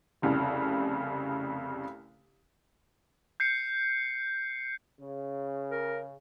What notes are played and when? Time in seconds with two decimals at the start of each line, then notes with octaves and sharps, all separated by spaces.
0.22 F1 C2 C#3
3.40 G6 C7 C#7
4.99 C#3
5.71 A#4